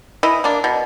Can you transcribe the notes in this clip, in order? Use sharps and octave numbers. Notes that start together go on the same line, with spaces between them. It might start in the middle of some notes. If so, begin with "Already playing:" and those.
E3 E4 D#5
A#3 D4
B2